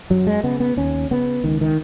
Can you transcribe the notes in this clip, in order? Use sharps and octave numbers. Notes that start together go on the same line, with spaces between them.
F#2 F#3
G#3
C#3 B3
B3
D#2 C#4
C#3 B3
C#2 D#3
D#3